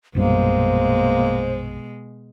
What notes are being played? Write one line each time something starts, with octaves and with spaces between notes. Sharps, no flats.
A#1 F#2 B2 G3 G#3 A#3 C5